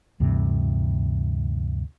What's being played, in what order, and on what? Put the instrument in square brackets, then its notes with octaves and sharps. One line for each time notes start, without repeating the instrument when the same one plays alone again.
[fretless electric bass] D2 G2 C3 E3